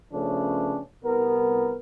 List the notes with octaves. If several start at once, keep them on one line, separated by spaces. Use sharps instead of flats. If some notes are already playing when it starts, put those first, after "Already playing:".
C#3 F3 A3 B3 C#4 D4
C2 B3 A#4